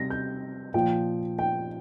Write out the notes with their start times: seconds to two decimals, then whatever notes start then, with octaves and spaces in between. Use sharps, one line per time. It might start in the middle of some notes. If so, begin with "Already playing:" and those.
Already playing: C3 G3 A#6
0.10 G6
0.74 A#2 F3 G5
1.39 G5